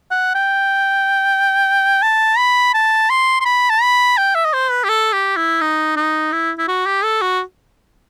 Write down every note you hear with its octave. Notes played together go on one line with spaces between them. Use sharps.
F#5
G5
A5
B5
A5
C6
C6
B5
A5
B5
G5
E5
D#5
C5
B4
G4
A4
G4
E4
D#4
D#4
E4
E4
F#4
G4
A4
F#4